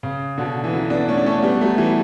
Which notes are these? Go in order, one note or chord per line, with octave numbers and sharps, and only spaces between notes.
C#3
B2 D3
E3
D3 F#3
B3 D4
A3 C#4
D4
A3 C#4
G3 B3
F#3 A3
E3 G3